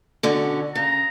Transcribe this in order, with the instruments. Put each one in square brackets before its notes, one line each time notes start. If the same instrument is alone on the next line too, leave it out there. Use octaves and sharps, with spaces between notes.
[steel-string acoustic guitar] B2 D3 C#4
[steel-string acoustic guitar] C#3 [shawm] A#5